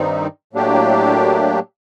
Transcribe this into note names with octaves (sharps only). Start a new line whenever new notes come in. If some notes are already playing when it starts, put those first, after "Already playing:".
Already playing: G2 D#3 G3 C4 D#4
A2 F#3 A#3 D4 G4